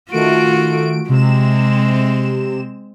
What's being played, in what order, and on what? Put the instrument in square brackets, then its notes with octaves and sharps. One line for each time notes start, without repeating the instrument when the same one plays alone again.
[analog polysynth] D#3 A3 D7 [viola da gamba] F4 F#4
[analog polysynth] C3 E7 [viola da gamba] G#3 C4